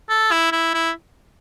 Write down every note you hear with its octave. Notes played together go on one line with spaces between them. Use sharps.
A4
E4
E4
E4